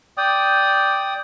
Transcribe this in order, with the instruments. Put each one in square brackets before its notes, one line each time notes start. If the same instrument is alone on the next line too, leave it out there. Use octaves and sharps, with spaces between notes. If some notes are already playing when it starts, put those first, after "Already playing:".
[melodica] D5 G5 D#6